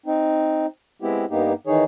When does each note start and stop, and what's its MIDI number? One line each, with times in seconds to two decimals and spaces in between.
0.06 0.66 60
0.06 0.66 63
1.02 1.25 56
1.02 1.25 59
1.02 1.25 60
1.02 1.25 64
1.02 1.25 67
1.30 1.53 43
1.30 1.53 58
1.30 1.53 59
1.30 1.53 63
1.30 1.53 67
1.67 1.84 51
1.67 1.84 52
1.67 1.84 63
1.67 1.84 68
1.67 1.84 73